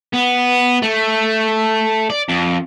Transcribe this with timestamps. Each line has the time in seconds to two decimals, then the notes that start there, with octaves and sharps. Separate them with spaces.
0.13 B3
0.82 A3
2.10 D5
2.29 F2